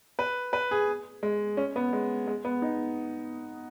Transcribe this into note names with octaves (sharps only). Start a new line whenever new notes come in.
B4
B4
G#4
G#3
C#4
B3
G#3
G#3
B3
D#4